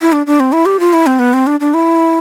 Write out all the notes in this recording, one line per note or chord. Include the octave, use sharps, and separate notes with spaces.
E4
D4
D4
C4
E4
G4
F4
E4
C4
B3
C4
D4
D4
E4